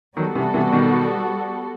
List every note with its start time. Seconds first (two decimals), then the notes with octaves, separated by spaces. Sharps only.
0.16 D#3 F#3 G3 B3 F#4 A4
0.35 C3 E3
0.54 C3 E3
0.72 B2 D#3